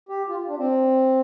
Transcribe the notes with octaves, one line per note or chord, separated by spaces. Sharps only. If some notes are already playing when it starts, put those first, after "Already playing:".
G4
F4
D4
C4